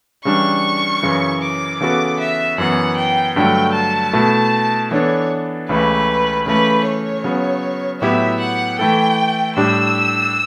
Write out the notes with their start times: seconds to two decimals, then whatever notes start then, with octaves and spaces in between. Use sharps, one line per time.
0.25 C#3 E3 G3 D4 C#6
1.03 F#2 C#3 E3
1.42 D6
1.81 C#3 E3 B3 F#4 A4 D6
2.20 E5
2.58 F#2 E3 B3 F#5
2.98 G5
3.35 G2 D3 F#3 A3 G5
3.74 A5
4.13 B2 A3 E4 A4
4.91 E3 B3 D4 A4 C#5
5.69 C#2 C#3 E3 A3 E4 B4
6.46 C#3 E3 A3 B4
6.86 C#5
7.24 C#3 F#3 B3
8.01 A2 F#3 B3 E4 G4 E5
8.40 F#5
8.79 E3 A3 E4 A4 G5
9.57 A2 G3 D4 G4 E6